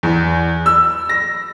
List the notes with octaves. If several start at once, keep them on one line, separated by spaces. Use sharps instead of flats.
E2
E6
A#6